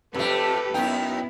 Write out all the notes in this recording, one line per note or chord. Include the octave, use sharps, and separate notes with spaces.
F2 A3 G4 A4 B4
F#2 B3 D#4 E4 G5